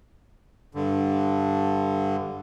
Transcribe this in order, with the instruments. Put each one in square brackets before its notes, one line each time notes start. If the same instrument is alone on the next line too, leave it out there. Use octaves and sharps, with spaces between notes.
[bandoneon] G2 D3